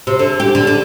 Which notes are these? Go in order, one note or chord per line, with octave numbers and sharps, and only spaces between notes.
C3
D3
G4
D3
D3